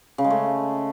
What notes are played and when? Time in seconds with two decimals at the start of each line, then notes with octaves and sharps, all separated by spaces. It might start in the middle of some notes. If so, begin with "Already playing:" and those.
0.18 C#3
0.24 G#3
0.30 A3